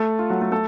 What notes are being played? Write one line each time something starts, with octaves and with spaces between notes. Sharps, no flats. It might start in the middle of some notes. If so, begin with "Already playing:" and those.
Already playing: A3 A4
F4
F#3 F#4
A3 A4
A3 A4